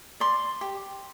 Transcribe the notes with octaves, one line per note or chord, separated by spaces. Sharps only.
D5 C6
G4